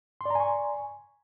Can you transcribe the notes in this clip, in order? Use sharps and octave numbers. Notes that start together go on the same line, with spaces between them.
D5 G#5 A#5 C6 C#6